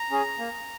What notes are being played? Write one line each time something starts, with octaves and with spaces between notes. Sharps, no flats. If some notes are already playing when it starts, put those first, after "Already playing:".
Already playing: A#5
C#4 G#4
A#3